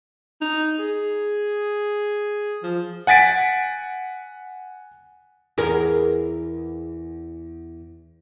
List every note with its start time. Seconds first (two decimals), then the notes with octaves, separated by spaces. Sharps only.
0.41 D#4
0.79 G#4
2.63 F3
3.07 F#5 G#5 A6 B6 D7
5.58 E2 G#4 A#4